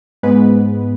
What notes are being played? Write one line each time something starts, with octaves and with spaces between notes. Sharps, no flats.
G#2 G#3 B3 B4